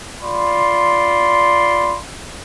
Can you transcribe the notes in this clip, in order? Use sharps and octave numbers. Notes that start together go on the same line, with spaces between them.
F4 D5 B5 C6